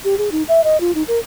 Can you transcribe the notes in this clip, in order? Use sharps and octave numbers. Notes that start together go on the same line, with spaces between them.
G4
G#4
D#4
E5
D#5
F4
D#4
A#4